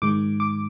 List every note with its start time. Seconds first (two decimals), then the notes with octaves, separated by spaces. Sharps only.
0.02 G#2 D#3 G#3 D6
0.40 D6